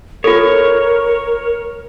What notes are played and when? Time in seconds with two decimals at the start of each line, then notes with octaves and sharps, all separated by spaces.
0.24 F4 A4 A#4 C#5